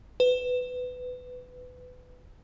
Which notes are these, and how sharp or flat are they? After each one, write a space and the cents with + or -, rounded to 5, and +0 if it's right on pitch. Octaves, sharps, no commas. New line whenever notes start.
B4 +20